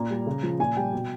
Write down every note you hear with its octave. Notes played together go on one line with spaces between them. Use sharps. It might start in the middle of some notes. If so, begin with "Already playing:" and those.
Already playing: A#2 A#5
G3
C#3
F3
A#2 G#5
G3 G5
B2